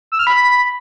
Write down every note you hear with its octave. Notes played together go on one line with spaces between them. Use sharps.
E6
F6
B5